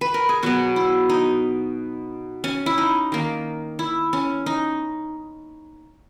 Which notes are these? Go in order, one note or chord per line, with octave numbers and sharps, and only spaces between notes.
B4
A#4
G#4
B2 F#3 B3 F#4
E4
D#4
C#4
E4
D#4
D#3 A#3
E4
C#4
D#4